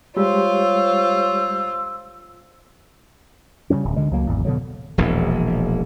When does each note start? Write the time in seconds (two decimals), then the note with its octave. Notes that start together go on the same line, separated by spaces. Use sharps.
0.17 G3 G#3 F4 G4 C5 C#5 E6
3.70 C#3 F#3 G3 C#4
3.85 D1
3.96 D2 D3 G#3
4.11 C#2 F#3 A#3
4.27 G#1 E2
4.45 B2 D3 F#3
4.98 E1 A#1 E2